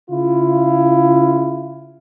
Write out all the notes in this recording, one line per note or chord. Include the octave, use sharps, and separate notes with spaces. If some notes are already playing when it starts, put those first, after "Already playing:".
C#3 E4 F4